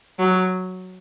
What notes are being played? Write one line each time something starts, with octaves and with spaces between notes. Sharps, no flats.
F#3